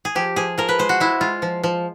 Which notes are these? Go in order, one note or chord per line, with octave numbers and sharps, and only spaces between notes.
G#4
F3 G4
F3 G#4
F3 A#4
B4
G#3 C5
F#4
G#3 E4
G#3 F4
F3
F3